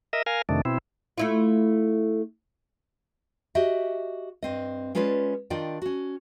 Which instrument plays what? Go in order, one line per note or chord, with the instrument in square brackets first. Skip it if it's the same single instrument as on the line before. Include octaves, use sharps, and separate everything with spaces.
[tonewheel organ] A#4 D#5 E5
A#4 F5 G#5
F2 C3 D#3 A3 D4
B2 C4 E4
[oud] A3 E4 F4
[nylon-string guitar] F#4 G4 D#5 E5
G2 C4 D#5
G#3 C#4 F4 B4 C#5 D5
D#3 D4 F4 D5 D#5 G5
C#4 F#4